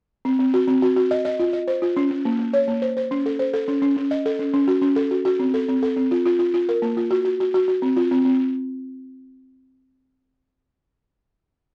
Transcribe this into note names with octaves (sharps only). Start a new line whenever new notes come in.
C4
C4
F#4
C4
F#4
F#4
D#5
D#5
F4
D#5
C5
F4
C#4
C#4
A#3
A#3
C#5
A#3
C5
C5
C#4
A4
C5
A4
C#4
C#4
C#4
D#5
A4
C#4
C#4
F#4
C#4
A4
F#4
F#4
C4
A4
C4
A4
C4
F4
F4
F4
F4
A#4
A#3
F4
F#4
F#4
F#4
F#4
F#4
C4
F4
C4
C4